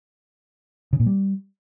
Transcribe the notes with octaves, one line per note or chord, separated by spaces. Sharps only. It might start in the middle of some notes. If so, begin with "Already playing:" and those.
C#3
A#2
G3